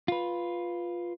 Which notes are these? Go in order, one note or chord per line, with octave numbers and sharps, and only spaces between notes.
F4 B4